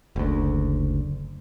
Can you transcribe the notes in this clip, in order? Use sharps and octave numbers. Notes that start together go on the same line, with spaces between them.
F#1 D2